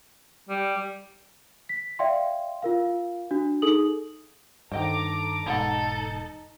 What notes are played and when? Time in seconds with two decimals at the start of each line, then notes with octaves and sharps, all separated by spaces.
0.49 G3
1.69 B6
1.99 D5 E5 F5 G5 C6
2.63 F4 A#4 F5
3.31 D4 F#4
3.62 D#4 G#4 A4 D#6 F#7
4.71 G2 D#3 A4 C5 D#5 G5 A#5 D6
5.46 E1 G#2 B3 D#4 A4 F5 F#5